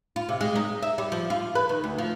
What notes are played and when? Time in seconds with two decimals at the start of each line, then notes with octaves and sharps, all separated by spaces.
0.16 F4
0.29 C3
0.41 G#3
0.56 D#4
0.83 E5
0.98 G3
1.12 F3
1.30 F4
1.55 B4
1.69 D#3
1.84 D2
1.98 F3